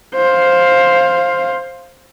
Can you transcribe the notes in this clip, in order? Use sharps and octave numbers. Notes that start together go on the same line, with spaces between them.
C5 F5